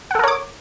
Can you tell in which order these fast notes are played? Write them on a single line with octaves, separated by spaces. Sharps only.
F#5 A4 A#4 C#5 D6